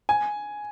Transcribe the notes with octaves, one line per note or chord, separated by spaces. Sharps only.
G#5